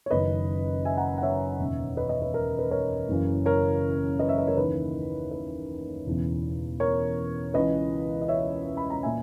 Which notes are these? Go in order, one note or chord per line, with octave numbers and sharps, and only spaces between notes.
C#5
F#1 F#2 D#3 B4 D#5
E5 G#5
F#5 A#5
F#5
C#5 E5
E1 D#2 C#3
B4 D#5
B4 D#5
B4
A#4
B4
A#4 C#5
F#1 F#2 C#3 E3
A#4 C#5
B4 D#5
C#5 E5
B4 D#5
A#4 C#5
D#2 C#3 E3 B4
B4
E1 E2 C#3 E3
A#4 C#5
C#2 C#3 E3 B4 D#5
D#5
C#5 E5
B5
A#5
A#2 E5 G#5